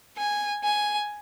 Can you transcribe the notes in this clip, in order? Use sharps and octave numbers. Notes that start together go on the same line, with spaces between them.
G#5
G#5